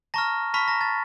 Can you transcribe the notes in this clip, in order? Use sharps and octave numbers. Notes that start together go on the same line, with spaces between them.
A5 A#5 C#6 F6 A#6
A5 B5 C#6 F6 B6
A#5 A#6
A5 A6